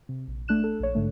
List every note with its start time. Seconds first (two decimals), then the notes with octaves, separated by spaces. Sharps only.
0.09 C3
0.28 A#1
0.48 A3 D4 F#6 E7
0.64 A4
0.80 A#1 C#5
0.95 G#2 D3 A3